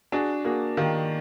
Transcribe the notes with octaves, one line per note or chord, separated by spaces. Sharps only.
D4 F#4 G#4
A#3 F#4 G#4
D#3 F4 G4